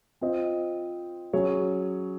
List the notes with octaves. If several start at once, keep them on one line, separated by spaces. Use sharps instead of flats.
C4 F4 C5 D#5
F#3 C#4 G#4 C#5